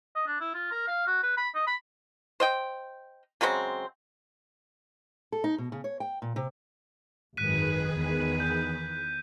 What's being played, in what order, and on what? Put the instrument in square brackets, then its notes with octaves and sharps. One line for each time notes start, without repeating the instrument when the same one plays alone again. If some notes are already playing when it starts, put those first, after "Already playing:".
[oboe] D#5
D4
E4
F4
A#4
F5
F#4
B4
B5
D#5
B5
[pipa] C5 D#5 G5
C#3 F#3 G#3 C4
[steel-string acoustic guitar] A4
D#4
B2
C#3
C#5
G5
A#2
C3
[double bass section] G#1 F#2 [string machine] D#3 G#4 B4 [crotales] F#6 B6 D#7
[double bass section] E2
[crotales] G6